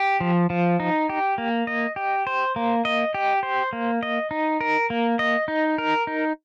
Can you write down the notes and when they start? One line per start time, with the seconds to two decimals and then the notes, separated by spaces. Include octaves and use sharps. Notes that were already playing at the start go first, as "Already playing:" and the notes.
Already playing: G4
0.20 F3
0.50 F3
0.80 D#4
1.09 G4
1.38 A#3
1.67 D#5
1.96 G4
2.27 C5
2.56 A#3
2.85 D#5
3.14 G4
3.43 C5
3.73 A#3
4.03 D#5
4.31 D#4
4.61 A#4
4.90 A#3
5.19 D#5
5.48 D#4
5.78 A#4
6.07 D#4